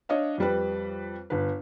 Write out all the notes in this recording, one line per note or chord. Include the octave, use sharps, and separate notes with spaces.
D4 C#5 D#5 F5
F2 G3 B4
G1 B4